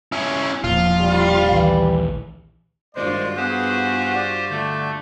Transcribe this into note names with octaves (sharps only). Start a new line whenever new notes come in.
C#4 E4
E1 A#2 F3 F4
G3
A#1 D#2 D#3 E3
G#1 G2 G#3 F4 F#4 C5 D5
B3 G4 G#4 C5 F#5
D5
D3 A3 G6